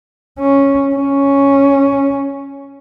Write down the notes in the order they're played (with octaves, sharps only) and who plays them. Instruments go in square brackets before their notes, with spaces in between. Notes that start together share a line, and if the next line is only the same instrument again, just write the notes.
[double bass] C#4
C#4